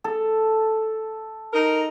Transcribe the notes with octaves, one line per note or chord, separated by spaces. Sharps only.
A4
D#4 A#4